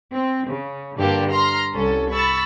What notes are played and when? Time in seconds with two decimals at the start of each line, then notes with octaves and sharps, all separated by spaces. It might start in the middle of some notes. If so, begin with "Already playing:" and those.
0.14 C4
0.48 C#3
0.96 G2 D3 A#3 D4 G4
1.30 A#5 C6 F6
1.73 C2 C#4 A4
2.11 B5 C#6 E6 A6